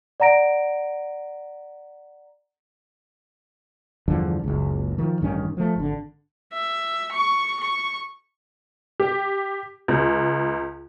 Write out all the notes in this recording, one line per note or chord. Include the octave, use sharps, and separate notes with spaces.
D5 F#5 A#5 A#6 D7
E2 G2 D3 F3
F#1 C#2
D#3 F3
A1 G2 D#3 C#4
F3 A3
G#1 D3
E5
C#6
C#6
G4
C#2